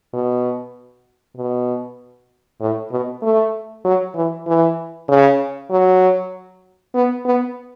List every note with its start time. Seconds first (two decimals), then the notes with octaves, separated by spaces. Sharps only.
0.13 B2
1.37 B2
2.61 A2
2.91 B2
3.23 A3
3.85 F#3
4.15 E3
4.47 E3
5.09 C#3
5.71 F#3
6.94 B3
7.25 B3